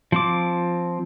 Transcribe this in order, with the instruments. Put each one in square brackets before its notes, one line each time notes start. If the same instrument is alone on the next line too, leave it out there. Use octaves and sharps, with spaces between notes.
[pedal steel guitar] F3 C4 D6